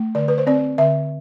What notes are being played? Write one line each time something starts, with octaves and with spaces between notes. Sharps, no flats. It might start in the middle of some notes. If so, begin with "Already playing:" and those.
Already playing: A3
D3 D5
B4
C5
C4 D5
D3 E5